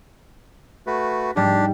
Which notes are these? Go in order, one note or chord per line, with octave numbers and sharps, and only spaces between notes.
A3 F#4 B4
G#2 G3 D4 G4